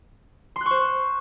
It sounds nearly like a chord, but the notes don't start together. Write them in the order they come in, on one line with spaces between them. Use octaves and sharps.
C6 F#6 C#6 C5